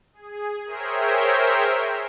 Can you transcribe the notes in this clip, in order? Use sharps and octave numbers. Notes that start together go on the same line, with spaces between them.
G#4
G#4 A#4 C5 C#5 E5 G5